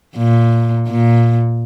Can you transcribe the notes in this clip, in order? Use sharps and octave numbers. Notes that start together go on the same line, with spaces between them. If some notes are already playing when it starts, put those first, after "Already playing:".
A#2
A#2